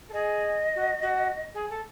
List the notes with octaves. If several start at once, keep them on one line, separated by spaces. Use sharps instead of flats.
A4
G#4 D#5
F#4
F#4
G#4
A4